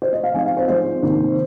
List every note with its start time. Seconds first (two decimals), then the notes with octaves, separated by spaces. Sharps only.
0.02 C5
0.13 D#5
0.24 F5
0.34 F3 G#3 C4 D#4 G#5
0.45 F5
0.57 C5
0.68 F3 G#3 C4 D#4 C5
1.03 C3 D#3 A#3 D#4